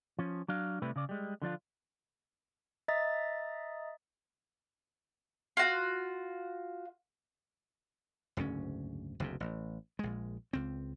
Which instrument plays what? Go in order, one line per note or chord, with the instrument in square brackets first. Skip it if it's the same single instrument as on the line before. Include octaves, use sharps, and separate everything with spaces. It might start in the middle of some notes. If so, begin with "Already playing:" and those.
[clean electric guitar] F3 C#4
F#3 D4 F5
C3 G3 A3 E4 B4
C#3 D5
G3 G#3
D3 F3 D4 F4
[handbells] D#5 E5 A#5 D#6 A6 B6
[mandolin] F4 F#4
[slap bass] F#1 D2 G#2 C#4
F#1 D2 A2 C3
A1
A#1 G#3
C#2 C4